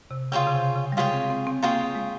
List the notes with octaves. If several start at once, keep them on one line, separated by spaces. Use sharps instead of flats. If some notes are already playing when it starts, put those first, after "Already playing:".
C3
C#3 F4 G#4 C#5 G5
C#3
C3
C#3
G3
G#3 F4 G#4 C#5 G5
C4
C4
C4
A#3 F4 G#4 C#5 G5
G#3